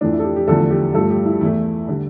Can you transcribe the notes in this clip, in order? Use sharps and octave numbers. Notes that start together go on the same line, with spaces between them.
F2 E3 A3 D4
E4
A4
G4
G4
E2 D3 F3 A3 A4
G4
G2 F3 A3 A4
G4
E4
E2 E3 A3 E4
D3 G3